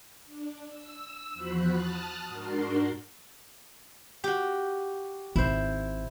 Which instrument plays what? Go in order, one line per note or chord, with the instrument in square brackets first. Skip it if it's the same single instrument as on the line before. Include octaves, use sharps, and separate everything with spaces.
[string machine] D4
E6
E2 F3 F#4 C5 B5 F#6
A5 D#6 F6 F#6 A6
G#2 D4 F#4 A#4 C6
[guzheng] F#4 G4
[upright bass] G#1 [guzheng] E4 C5